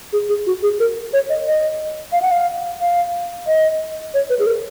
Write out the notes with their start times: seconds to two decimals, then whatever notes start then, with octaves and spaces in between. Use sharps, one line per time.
0.13 G#4
0.29 G#4
0.46 F#4
0.63 G#4
0.80 A#4
1.13 C#5
1.30 D#5
1.46 D#5
2.12 F5
2.22 F#5
2.31 F5
2.80 F5
3.47 D#5
4.14 C#5
4.30 B4
4.39 G#4
4.46 A#4